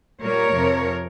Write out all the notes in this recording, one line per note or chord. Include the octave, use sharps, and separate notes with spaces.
A#2 G3 A#3 A#4 C#5
F2 C3 F3